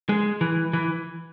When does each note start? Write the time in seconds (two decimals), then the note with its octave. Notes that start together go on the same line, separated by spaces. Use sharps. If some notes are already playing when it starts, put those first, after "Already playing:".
0.09 G#3
0.41 E3
0.73 E3